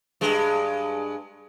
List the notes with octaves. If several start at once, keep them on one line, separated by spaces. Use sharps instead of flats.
G2 G#3